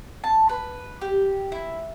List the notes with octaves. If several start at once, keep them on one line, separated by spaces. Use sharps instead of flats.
A5
B4
G4
E4